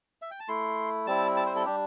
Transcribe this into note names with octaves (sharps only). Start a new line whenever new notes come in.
E5
G5
A5
A3 E4 C6
G3 C4 E4 A5
A5
C5
A4
G3 D4 G4